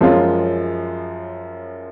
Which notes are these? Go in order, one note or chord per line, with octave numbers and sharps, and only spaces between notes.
F#2 F3 G#3 C#4 F4